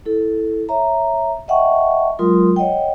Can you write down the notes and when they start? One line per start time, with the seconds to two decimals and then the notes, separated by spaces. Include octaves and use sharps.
0.06 E4 A4
0.69 C#5 E5 A#5
1.48 D#5 E5 F#5 G5 A5 C#6
2.19 F#3 G#3 F4 A#4 C6 D#6
2.56 C#5 D#5 F#5 G5